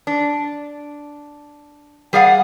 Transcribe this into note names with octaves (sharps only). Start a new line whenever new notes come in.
D4
G3 G#4 D5 F5 F#5